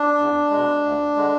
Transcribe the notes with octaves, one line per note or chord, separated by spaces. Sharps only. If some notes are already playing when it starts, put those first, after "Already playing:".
Already playing: D4
E2
B2 G#3
D2
D3 G#3